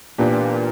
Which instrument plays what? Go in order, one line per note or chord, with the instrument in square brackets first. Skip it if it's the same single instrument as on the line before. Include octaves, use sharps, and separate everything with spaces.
[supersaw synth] A#2 [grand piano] E3 B3 D4 G4